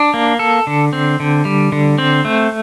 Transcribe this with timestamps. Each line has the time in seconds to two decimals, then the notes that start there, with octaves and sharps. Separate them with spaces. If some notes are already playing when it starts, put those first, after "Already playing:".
Already playing: D4
0.14 A#3
0.39 A4
0.67 D3
0.93 C4
1.20 D3
1.45 G3
1.72 D3
1.98 C4
2.25 A3